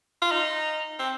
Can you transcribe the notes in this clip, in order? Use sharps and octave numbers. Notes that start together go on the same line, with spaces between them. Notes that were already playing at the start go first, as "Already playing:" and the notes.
F4
D#4
C4